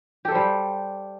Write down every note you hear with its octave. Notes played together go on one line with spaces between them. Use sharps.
G3 G4 A4 C5